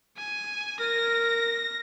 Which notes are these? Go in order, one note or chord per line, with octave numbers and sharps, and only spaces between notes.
G#5
A#4 A#6